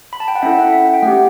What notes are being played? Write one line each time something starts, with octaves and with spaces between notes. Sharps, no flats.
B5
A5
G5
F#5
C#4 E4 A4 E5
F#5
E5
G5
A3 C#4 G4 F#5